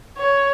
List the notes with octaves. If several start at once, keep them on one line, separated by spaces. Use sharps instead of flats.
C#5